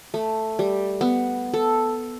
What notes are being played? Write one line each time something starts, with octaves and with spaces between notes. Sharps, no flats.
A3
G3
B3
A4